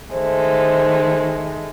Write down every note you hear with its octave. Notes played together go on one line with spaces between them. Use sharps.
D#3 G#3 A3 C5